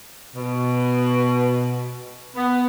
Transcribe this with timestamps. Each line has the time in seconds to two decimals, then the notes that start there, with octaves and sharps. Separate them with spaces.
0.36 B2
2.36 B3